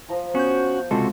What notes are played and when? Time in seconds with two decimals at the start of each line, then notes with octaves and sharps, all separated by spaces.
0.08 F3 A#5 D#6
0.35 B3 C#4 F#4 G6
0.91 C#2 C3 G#3 F4 F#4 A4